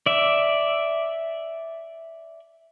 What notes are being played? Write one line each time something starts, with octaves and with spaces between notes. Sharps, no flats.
D5 E5